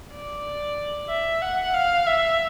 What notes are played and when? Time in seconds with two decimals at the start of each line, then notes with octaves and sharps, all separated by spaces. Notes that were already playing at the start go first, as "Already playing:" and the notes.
0.13 D5
1.09 E5
1.42 F#5
1.74 F5
2.06 E5